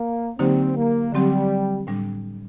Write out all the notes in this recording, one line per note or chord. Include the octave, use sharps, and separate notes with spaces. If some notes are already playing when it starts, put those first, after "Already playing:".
Already playing: A#3
D3 F#3 A#3 C4 D#4 G4
A#3
D3 F#3 G3 C4 G4
A2 G3 D4